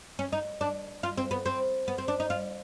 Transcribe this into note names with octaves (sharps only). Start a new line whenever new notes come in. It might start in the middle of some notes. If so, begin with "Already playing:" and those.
C#4
D#4
D4
F4
C4
B3
C4
B3
C4
D4
D#4
F4